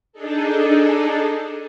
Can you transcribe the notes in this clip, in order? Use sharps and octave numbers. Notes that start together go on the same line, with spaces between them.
D4 D#4 G#4 A4